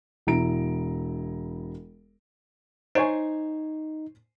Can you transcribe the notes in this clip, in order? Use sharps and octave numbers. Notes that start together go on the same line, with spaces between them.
E1 E4 A#5 D7
D#4 C5 C#5 G#5